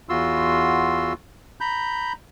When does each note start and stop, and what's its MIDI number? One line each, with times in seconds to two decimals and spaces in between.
0.09 1.13 40
0.09 1.13 65
0.09 1.13 66
0.09 1.13 84
0.09 1.13 88
1.61 2.13 82
1.61 2.13 83
1.61 2.13 91